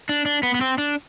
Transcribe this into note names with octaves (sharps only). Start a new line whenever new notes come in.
D4
D4
B3
B3
C4
D4